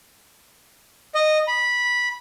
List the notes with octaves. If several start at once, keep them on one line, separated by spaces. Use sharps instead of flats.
D#5
B5